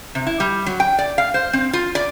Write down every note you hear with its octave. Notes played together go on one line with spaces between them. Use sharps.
C3
E4
G3
F#3
G5
D5
F5
C5
C4
F4
D5